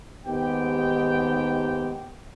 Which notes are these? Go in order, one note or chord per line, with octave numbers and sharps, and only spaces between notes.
D#2 G#2 B3 G4 G5